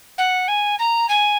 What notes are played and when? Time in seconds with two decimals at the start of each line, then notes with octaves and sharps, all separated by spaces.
0.18 F#5
0.47 G#5
0.78 A#5
1.08 G#5